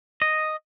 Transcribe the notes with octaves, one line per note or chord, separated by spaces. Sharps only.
D#5